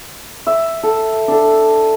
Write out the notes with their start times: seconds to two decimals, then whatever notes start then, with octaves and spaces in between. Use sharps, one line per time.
0.47 E5
0.83 A4
1.28 D4 A4